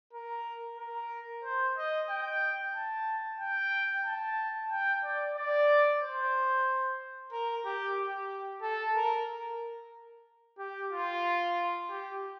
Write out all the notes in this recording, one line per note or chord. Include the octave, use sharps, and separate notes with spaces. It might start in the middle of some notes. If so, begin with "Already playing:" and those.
A#4
A#4
C5
D#5
G5
A5
G5
A5
G5
D5
D5
C5
A#4
G4
G4
A4
A#4
A#4
G4
F4
G4